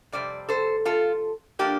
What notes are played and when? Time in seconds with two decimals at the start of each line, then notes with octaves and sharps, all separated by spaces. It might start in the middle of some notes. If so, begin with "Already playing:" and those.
0.12 F2 C3 G3 C4 D5
0.49 A4 C5
0.85 F4 A4
1.59 F3 A#3 D4 G4